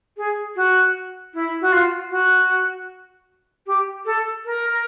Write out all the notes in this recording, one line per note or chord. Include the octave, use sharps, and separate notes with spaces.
G#4
F#4
E4
F#4
F4
F#4
G4
A4
A#4